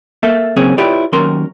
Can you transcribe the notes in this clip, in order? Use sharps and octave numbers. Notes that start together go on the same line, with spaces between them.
A#3 A4 E5
C#3 F#3 A#3 C4 C#4 G#4
E4 F4 G4 B4 C#5 D5
D#2 F#3 C#4 A#4 C6